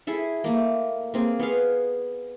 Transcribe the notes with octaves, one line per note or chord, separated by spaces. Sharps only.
E4 G#4 A4 E5
A3 A#3
A#3 C4 G#4
B3 G#4 F5